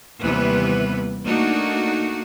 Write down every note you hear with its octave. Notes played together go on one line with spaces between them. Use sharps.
D#2 C3 E3 G3 B3 B4
A3 A#3 D4 D#4 F#4